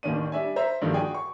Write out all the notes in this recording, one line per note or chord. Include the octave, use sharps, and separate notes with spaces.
A1 D#2 D#3 C#4 D4 D#7
G3 D4 E5 G#5
C5 E5 A#5
G2 D3 D#3 F3 A#3
F#4 G#4 D5 G5 G#5
C#6